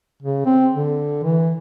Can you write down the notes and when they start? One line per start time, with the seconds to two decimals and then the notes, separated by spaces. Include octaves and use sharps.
0.22 C#3
0.46 C4
0.74 D3
1.23 E3